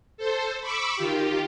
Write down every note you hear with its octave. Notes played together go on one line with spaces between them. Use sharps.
A4 C5
B5 C#6 D6 E6
D#3 F4 G4